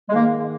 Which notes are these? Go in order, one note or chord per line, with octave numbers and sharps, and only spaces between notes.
G#3
G#2 D#3 A#3